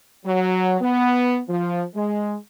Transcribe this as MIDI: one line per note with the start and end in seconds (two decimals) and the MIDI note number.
0.25 0.77 54
0.81 1.40 59
1.49 1.83 53
1.95 2.36 56